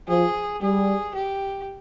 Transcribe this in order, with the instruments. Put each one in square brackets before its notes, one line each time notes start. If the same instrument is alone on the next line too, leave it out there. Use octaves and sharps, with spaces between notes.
[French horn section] F3 [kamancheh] G#4
[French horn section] G3 [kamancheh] G#4
[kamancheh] G4